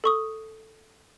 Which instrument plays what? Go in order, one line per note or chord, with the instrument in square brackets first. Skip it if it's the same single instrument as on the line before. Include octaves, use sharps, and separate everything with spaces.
[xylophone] A4 C#6 D#6